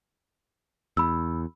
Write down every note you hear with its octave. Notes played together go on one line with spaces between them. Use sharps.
E2 B5 E6